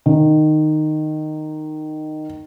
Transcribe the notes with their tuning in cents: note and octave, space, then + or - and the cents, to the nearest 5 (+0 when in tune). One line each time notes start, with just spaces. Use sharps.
D#3 -15